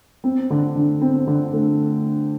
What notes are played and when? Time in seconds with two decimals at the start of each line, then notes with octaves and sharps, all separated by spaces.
0.24 C4
0.50 D3
0.76 D3
1.01 C4
1.27 D3
1.53 A3